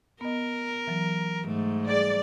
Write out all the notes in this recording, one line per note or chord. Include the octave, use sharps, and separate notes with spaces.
B3 A#4 D#5
E3 F#3
G#2 A3
G3 G#4 D5